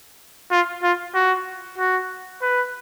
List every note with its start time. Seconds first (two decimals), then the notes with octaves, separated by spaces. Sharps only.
0.52 F4
0.83 F4
1.15 F#4
1.78 F#4
2.42 B4